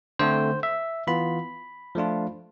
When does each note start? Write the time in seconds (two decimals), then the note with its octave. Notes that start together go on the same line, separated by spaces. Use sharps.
0.19 D3 A3 C4 C5
0.63 E5
1.07 E3 B3 F4 B5
1.95 F3 A3 D4 F4